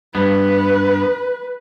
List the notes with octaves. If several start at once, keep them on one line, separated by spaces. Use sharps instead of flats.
G2 B3 B4